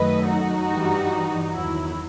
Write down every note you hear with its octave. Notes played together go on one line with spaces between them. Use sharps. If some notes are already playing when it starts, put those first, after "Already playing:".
Already playing: F#2 D#3 F#3 A3 B4 D#5
D#4 F#4
G2 E3 G3
E2 D#3 F#3 E4